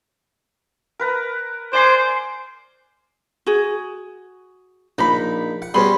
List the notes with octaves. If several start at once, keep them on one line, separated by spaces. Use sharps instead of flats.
A#4 B4 A#5
C5 D5 G#5 C6
F#4 G#4
A#1 D4 D#4 B5
F#5
G3 B3 C#4 F#4 G#4 B5 C6